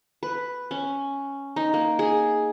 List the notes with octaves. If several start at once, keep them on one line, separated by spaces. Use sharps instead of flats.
B4
C#4
D#4
A#3
G#4